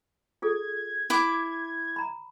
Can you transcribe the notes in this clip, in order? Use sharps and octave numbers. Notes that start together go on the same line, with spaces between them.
F4 G#4 A4 G#6
E4 D6
A#5 B5